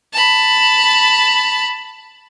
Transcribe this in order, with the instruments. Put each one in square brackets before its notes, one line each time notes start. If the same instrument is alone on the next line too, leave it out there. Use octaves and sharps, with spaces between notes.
[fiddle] A5 B5